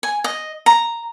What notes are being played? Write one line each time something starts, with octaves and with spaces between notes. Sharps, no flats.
G#5
D#5
A#5